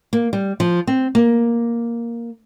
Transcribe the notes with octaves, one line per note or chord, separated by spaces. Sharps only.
A#3
G3
F3
C4
A#3